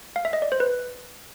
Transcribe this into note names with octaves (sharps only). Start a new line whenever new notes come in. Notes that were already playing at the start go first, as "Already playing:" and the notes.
F5
E5
D#5
D5
C5
B4